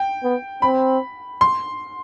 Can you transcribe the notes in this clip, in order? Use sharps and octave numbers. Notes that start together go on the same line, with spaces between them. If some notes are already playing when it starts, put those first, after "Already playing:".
Already playing: G5
B3
C4 B5
C6